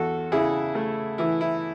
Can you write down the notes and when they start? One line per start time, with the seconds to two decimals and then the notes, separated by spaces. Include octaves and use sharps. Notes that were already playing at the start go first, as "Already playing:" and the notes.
Already playing: E2 F#4 A4
0.32 C#3 E4 G#4
0.75 A3
1.18 E3 E4
1.41 E4